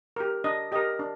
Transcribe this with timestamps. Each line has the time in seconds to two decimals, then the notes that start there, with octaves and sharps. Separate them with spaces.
0.16 G4 A#4
0.44 D4 D#5
0.72 G4 A#4 D#5
0.99 D4